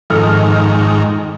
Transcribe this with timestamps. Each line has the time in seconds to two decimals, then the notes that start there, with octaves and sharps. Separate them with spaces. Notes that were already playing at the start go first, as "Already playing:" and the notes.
0.10 F2 G#2 D#3 A4 F6